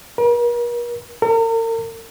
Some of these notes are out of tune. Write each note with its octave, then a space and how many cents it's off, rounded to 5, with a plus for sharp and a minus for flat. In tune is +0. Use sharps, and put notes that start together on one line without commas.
A#4 +45
A#4 -40